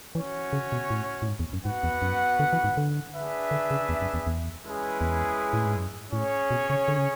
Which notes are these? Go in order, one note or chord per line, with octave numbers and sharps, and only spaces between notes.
E3 C#4 F#4 C#5
C#3
B2
A2
A2
G#2
E2
F#2
G#2 B3 F#4 B4 F#5
E2
F#2
D3
E3
G#2
D3
D4 G#4 B4 E5
D3
C#3
E2
F#2
E2
E2
G#3 C#4 E4 G#4 B4
E2
A2
G#2
F#2
A2 C#4 G#4 C#5
B2
C#3
D3
C#3